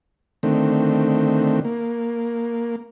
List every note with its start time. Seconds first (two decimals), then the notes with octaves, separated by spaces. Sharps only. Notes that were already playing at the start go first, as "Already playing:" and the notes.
0.43 D3 D#3 A3 C4
1.65 A#3